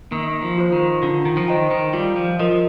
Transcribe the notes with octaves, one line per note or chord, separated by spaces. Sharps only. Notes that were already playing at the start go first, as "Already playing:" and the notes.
D#3 A#3
F3
F4 C5
D#3
D3 F4
D#3
F3
D#3 C5 D#5 G5
D#3
G3 F4
F3
F3 A#4 D#5